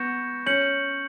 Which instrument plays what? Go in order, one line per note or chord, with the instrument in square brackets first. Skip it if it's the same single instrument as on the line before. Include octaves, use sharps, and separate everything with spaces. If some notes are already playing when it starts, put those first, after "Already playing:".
Already playing: [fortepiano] B3 [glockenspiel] C#6 G6 A#6 C#7 E7
[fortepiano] C#4 [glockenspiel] G6 C#7 F#7